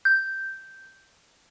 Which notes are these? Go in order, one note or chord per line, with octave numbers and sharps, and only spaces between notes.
G6